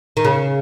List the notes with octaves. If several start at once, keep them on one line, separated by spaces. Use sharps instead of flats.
D#3
C#3